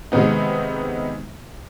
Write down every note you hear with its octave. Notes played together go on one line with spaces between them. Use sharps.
C3 D#3 G#3 B3 D#4